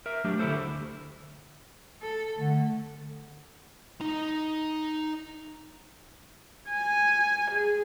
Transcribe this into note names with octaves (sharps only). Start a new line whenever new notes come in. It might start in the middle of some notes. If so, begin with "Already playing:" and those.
A#4 E5
F#3 A3 D4 G4
D3 D4 E4 G4 A4 C5
D2
A4
D3 A3
D#4 A#5
G#5
G#4